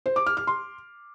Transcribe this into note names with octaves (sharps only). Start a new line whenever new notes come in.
C5
D6
F6
F6
C6